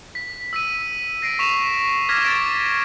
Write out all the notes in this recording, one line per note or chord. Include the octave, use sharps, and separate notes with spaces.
B6
E6 B6 D#7
A#6 C7 D7
C#6 B6 E7 F7
D6 F6 G#6 A#6 B6
A6 B6 D7